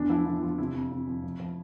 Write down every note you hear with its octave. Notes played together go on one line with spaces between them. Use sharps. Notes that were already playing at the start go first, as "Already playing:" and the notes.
Already playing: E2 D4
F3 E4
F3 D4
E4
F3 F4
C3 E4
F2
F2
F2
F3
F3